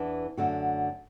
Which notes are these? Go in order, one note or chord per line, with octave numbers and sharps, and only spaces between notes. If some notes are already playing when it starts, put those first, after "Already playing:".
Already playing: E2 E3 D4
F#2 D3 A3 F#4